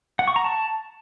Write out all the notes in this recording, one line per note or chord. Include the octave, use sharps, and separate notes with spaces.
F#5
C#6
A#5
A5